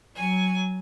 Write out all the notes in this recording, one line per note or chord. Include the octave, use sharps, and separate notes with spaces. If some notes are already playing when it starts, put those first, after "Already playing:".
F#3 G#5